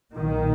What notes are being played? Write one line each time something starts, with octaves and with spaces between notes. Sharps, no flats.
B1 A#2 D#3